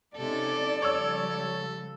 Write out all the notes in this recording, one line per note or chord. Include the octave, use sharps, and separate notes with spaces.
C3 C#4 D#4 A4 D5
C#3 F3 G3 A4 C#5 E6